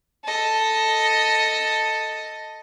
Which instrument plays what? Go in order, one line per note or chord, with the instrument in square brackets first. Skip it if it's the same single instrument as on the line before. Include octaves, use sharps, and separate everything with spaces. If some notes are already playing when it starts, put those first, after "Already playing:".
[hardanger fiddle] A4 D#5